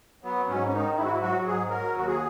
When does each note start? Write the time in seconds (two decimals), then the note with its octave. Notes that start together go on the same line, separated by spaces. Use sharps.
0.24 F#3 B3
0.49 G#2 C#4
0.68 C#4
0.73 D#3 D#4
0.97 G#2 E4
1.05 F#4
1.12 E4
1.22 F#3 F#4
1.46 G#2 G#4
1.70 F#3 A#4
1.95 D#2 F#4
2.08 G#4